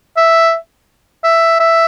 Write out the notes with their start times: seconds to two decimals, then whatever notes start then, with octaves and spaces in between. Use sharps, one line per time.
0.17 E5
1.24 E5
1.60 E5